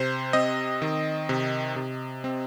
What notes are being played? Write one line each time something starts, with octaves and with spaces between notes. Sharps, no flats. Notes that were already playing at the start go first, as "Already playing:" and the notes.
Already playing: C3 C5
C4 D#5
D#3
C3
C3
C4